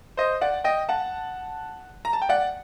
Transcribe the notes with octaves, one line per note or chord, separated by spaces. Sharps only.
C5 D#5
D5 F#5
D#5 G5
F#5 A5
A#5
A5
G5
D5 F#5